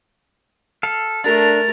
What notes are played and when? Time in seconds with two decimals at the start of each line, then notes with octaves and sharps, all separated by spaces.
0.83 A4 F5
1.24 A3 D4 A#4 A6